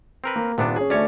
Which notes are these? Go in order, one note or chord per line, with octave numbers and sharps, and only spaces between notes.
C4 A#4 B4
A#3
D#1 C3 B3 D4
C#4 G#4
D2 A3 C#4 C#5 D5